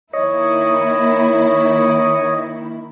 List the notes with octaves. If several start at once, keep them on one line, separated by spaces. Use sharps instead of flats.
D#3 A#3 E4 C#5 D#5